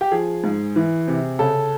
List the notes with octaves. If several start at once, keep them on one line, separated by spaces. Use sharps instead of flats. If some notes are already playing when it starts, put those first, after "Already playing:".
G4
F3 G#4
G#2
E3
C3
C#3 A4